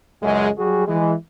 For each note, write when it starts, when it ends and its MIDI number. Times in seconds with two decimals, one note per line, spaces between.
0.22 0.49 37
0.22 0.49 42
0.22 0.49 56
0.58 0.83 54
0.58 0.83 55
0.58 0.83 66
0.58 0.83 68
0.87 1.13 52
0.87 1.13 56